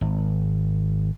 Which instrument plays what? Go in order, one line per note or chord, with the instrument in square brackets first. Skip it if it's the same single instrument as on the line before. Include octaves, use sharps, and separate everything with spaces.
[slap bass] G#1